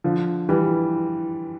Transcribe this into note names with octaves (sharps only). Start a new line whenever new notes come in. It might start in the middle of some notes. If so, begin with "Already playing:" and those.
D3 F3
E3 G3